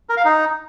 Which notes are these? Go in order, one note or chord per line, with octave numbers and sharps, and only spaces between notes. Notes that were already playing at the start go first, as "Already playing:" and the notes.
A#4
F5
D#4